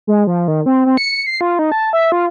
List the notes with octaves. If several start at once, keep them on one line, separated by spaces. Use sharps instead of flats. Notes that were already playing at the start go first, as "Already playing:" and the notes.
G#3
F3
D#3
C4
C4
C#7
C7
F4
D#4
A5
E5
F4